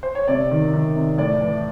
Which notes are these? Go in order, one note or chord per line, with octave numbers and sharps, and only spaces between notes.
C5
C#5
C3 D5
D#3
D#3
C3
A2 D5
E3